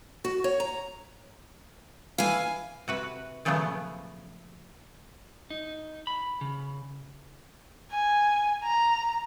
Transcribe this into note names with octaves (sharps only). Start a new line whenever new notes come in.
F#4
C#5
A#5
E3 F5 G#5
C3 F#4 B4
A#2 C#3 F3 F#3 A3 B3
D#4
B5
C#3
G#5
A#5